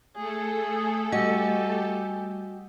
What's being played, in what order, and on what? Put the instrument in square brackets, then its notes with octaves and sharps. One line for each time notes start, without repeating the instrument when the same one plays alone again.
[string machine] A3 A4 [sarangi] G#4
[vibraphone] G3 G#5 E6 [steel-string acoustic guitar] F#4 D#5 [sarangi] G4